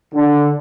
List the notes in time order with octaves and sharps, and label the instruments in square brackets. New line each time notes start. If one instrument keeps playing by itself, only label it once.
[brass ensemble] D3